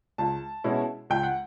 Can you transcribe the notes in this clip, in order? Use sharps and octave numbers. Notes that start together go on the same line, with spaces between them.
C#2 A5
B2 G#3 C#4 E4
C#2 G5
F#5